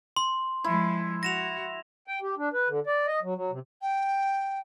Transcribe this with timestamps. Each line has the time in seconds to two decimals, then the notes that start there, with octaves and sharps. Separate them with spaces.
0.16 C6
0.64 F3 G#3 E4
1.23 F#4 A#6 E7 F7
2.07 G5
2.22 G4
2.38 D4
2.53 B4
2.69 D3
2.87 D5
3.07 D#5
3.23 F#3
3.35 F#3
3.51 C3
3.82 G5